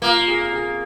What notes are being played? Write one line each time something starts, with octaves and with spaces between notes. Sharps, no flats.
A#3 F4
F4
G#4
F5
G#4